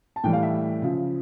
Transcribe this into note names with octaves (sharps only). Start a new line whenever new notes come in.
A5
A2 E3 G3 G5
F5
E5
C#3 F3